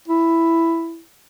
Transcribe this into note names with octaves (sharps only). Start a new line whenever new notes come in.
E4